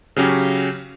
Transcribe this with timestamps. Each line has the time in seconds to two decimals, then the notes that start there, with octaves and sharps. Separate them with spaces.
0.16 C#3 F#3 C#4 G4